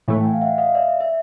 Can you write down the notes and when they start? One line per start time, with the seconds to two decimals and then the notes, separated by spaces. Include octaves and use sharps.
0.08 A2 E3 A3
0.21 G5
0.25 F#5 G#5
0.33 F5
0.41 E5 F#5
0.58 D#5 F5
0.75 D5 E5
1.01 E5